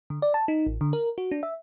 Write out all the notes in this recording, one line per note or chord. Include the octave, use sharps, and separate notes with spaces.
D3
D5
A5
D#4
A1
D3
A#4
F#4
D4
E5